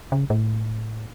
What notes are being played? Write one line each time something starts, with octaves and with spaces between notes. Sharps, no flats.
C#3
A2